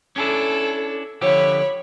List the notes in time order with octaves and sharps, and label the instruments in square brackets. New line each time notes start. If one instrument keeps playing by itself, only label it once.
[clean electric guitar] C#4 D4 E4 [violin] A4
[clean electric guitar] D3 F3 G4 [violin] C#5 B5